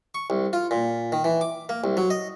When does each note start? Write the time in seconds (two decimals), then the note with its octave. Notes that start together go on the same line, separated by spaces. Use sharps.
0.15 C#6
0.30 C2
0.53 F4
0.71 A#2
1.12 D#3
1.24 E3
1.41 D6
1.69 A#3
1.84 C2
1.97 F#3
2.10 D#5